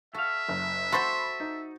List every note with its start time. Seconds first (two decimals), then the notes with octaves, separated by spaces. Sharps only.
0.14 F#4 A4 E5 F5
0.48 F#1
0.92 F#4 A4 C5 B5 C6 A6
1.40 D#4